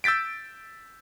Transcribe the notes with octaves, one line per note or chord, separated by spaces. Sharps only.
E6 G6 A6 B6 D7